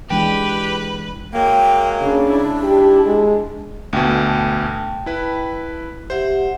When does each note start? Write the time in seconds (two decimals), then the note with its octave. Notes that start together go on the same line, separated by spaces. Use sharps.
0.10 E3 G#3 D4 G4 B4
1.34 F#3 G#3 A#3 G5
2.01 C#3 D4
2.30 G#2 E4
2.63 G4
3.05 G#3
3.93 D2 B2 G5 A5
5.06 E4 B4
6.10 G4 C5 E5 F#5